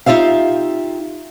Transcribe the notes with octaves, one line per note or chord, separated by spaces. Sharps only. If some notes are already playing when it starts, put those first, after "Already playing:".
D#4 F4 G4 E5 F5